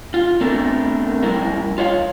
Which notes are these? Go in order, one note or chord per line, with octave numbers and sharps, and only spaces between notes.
F4
A3 B3 C4 D4 A4 A#4
F#2 C3 G3 E4 A#4
F4 C#5 E5 F5